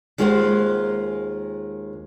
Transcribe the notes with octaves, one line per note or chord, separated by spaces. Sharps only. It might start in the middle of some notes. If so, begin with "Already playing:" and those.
D#2 G#3 F4 A#4 C5 F#5